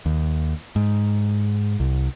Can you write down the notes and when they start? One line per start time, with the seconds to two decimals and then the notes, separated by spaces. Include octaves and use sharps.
0.06 D#2
0.76 G#2
1.80 C2